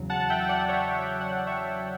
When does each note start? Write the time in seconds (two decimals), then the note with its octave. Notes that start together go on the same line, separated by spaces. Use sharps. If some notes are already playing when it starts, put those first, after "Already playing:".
Already playing: E2 C#3 F#3
0.10 F#5 A5
0.30 E5 G5
0.49 D5 F#5
0.68 C#5 E5
0.95 C#5 E5
1.21 D5 F#5
1.47 C#5 E5